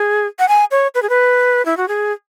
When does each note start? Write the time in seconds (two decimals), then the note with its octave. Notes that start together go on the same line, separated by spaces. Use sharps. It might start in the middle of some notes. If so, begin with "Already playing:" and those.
Already playing: G#4
0.39 F#5
0.48 G#5
0.71 C#5
0.95 B4
1.02 G#4
1.09 B4
1.65 E4
1.77 F#4
1.88 G#4